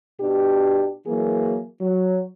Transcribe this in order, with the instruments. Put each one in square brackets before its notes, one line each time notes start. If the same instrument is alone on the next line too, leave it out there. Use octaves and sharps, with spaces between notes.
[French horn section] B2 D4 G4
E3 F#3 A#3 G#4
F#3